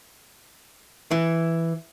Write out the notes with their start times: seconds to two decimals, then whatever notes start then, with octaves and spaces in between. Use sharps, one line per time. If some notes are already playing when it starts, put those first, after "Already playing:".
1.11 E3